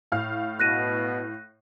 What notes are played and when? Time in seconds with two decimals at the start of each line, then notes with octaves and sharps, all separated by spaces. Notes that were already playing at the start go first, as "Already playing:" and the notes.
0.12 A2 F5 F6
0.60 B2 F#6 A#6 D#7